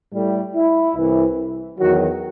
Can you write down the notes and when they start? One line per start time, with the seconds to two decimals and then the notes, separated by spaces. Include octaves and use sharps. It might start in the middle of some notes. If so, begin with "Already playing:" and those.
0.13 A2 G3
0.55 E4
0.96 C2 C3 E3
1.78 E2 D#3 F#3 F#4